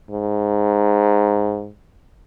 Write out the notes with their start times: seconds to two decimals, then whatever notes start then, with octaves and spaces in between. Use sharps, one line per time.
0.11 G#2